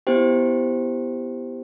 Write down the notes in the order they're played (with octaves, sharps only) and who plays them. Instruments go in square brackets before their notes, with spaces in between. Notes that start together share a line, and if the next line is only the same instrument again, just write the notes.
[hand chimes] B3 E4 G4 C5 G5